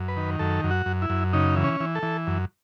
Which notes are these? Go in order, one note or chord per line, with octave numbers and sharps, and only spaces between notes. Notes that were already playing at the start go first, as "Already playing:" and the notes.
Already playing: F#2
B4
D#3
F#2 A4
F#2
F#4
F#2
E4
F#2
C#3 D#4
E3
C#4
E3
A4
E3
F#2